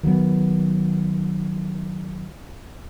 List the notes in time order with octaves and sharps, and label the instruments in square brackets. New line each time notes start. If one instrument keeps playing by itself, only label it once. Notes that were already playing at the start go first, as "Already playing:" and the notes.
[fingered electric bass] D#3 F#3 A#3 B3